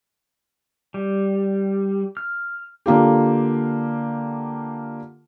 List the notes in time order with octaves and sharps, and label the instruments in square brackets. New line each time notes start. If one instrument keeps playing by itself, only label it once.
[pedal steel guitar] G3
F6
[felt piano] D3 A#3 F4 G4